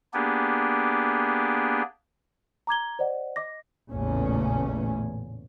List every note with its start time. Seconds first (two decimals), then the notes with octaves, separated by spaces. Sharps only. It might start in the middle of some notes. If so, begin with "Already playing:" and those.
0.14 A#3 B3 D4 G4 G#4
2.67 A#5 D6 G#6 G7
2.99 C5 D5 D#5 F#5
3.36 D#5 D6 A#6
3.90 A1 E2 A#2 C#3 A3 C#4